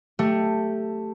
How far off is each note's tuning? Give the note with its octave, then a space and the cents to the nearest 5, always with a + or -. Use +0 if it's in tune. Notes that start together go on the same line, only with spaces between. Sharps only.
A3 +10 G4 +0